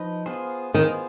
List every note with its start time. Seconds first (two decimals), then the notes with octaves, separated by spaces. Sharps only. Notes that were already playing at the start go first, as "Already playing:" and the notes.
Already playing: F3 D#4 B4
0.26 B3 F4 G#4 C5
0.74 D#3 B3 F4 G#4 C5